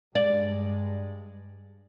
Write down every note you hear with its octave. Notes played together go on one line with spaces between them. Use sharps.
G2 G#3 D5